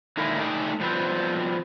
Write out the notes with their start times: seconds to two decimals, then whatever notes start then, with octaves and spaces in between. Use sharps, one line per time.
0.17 D3 D#3 G#3 A#3 E4
0.38 A3 D4 D#4 G4 G#4
0.80 F3 G3 B3 C4